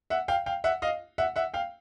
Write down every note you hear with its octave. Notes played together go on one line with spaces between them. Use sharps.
E5 F#5
F5 G5
F5 G5
E5 F#5
D#5 F5
E5 F#5
E5 F#5
F5 G5